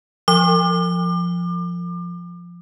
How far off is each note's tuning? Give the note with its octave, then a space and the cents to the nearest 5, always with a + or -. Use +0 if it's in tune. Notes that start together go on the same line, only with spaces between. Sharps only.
F3 +0 D6 +35